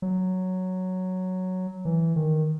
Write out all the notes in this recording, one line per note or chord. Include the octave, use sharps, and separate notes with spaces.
F#3
E3
D#3